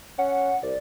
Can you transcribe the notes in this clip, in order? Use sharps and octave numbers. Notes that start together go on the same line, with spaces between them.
C#4 F#5
C2 D5